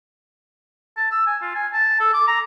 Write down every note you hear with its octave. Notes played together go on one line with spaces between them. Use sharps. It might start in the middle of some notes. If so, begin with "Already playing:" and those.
A5
E6
G#5
F4
G#5
A5
A4
D6
A#5